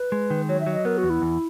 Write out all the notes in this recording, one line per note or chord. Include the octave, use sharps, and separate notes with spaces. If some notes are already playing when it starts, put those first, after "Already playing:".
Already playing: B4
G#3
D#3
F#3 C#5
E5
F#3
D#5
B3 A#4
F#4
E2
E4
E2